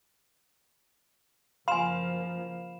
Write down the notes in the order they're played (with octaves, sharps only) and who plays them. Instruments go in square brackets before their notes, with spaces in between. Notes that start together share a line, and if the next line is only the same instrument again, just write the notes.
[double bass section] F#1 F3 A#3 [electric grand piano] F5 [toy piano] G#5 C6 [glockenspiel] B5 E7